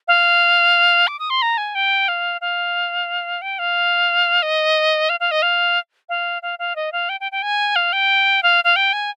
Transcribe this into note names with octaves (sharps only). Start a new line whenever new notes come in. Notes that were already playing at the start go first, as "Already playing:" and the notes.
F5
D6
D#6
C6
A#5
G#5
G5
F5
F5
G5
F5
D#5
F5
F5
D#5
F5
F5
F5
F5
D#5
F5
G5
G5
G5
G#5
F5
G5
F5
F5
G5
G#5